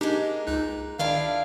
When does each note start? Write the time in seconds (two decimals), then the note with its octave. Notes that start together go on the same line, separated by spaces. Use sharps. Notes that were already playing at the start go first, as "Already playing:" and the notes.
0.01 G#3 A#3 D4 D#4 G4
0.47 C#2 D#4 F#6
0.99 D#3 D4 E4 F4 F5